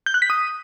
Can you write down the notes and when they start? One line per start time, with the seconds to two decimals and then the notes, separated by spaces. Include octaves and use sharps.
0.06 G6
0.14 F#6
0.22 B6
0.30 D#6